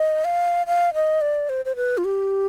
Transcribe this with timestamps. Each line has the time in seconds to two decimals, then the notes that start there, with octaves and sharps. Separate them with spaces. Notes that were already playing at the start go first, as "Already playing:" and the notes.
Already playing: D#5
0.25 F5
0.67 F5
0.94 D#5
1.21 D5
1.49 C5
1.65 C5
1.76 B4
1.98 F4
2.05 G4